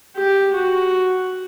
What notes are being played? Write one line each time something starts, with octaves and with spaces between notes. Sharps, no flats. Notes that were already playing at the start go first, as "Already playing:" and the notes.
G4
F#4